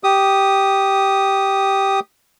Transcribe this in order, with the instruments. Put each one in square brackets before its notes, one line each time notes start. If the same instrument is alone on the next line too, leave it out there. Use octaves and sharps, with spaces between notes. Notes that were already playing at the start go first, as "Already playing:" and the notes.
[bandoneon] G4 D#6